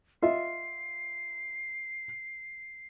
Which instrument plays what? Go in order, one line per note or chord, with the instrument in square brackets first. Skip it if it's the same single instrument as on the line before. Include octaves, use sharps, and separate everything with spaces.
[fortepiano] F4 D#5 E5 [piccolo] C7